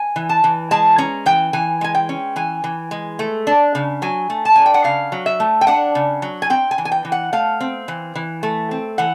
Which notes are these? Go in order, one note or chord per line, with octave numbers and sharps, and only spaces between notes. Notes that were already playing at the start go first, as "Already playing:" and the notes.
Already playing: G#5
E3
A5
E3
G#3 A5
C#4 A#5
E3 G5
E3 G#5
G#3 G#5
G5
C#4
E3 G#5
E3
G#3
A3
D4
C#3
F#3 G#5
A3
A5
D4 G#5
G5
F#5
C#3 F5
F#3
E5
A3
G5
D4 F#5
C#3
F#3
G#5
C4 G5
G#5
E3
G#5
G5
E3
F#5
A3 F5
C4
E3
E3
A3
C4
E3 F#5